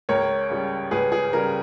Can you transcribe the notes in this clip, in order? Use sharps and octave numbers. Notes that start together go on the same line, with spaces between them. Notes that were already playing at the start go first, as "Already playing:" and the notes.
C#2 A#4 C#5
C#3 G3
C#2 G#4 B4
G#4
C#3 G3 A#4